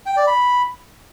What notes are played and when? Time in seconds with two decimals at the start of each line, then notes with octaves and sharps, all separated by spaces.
0.06 G5
0.16 D5
0.27 B5